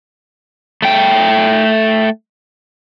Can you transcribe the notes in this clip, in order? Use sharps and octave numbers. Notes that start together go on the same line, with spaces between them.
A3 G5